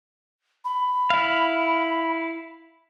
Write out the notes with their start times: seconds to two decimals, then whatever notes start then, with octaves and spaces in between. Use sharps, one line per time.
0.65 B5
1.10 E4 F5